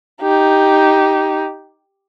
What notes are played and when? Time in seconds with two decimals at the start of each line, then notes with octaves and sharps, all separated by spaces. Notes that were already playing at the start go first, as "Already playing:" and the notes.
0.22 D#4 G4